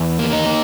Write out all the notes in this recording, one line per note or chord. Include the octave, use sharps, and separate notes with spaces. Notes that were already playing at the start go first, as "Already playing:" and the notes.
Already playing: E2
A#3
D#4
A#3